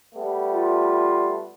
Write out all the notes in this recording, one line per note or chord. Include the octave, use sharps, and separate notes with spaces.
G3 A3 B3
F4